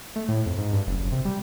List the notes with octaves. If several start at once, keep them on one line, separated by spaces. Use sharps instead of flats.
A3
A2
F2
G#2
G2
F#1
F#1
C3
G3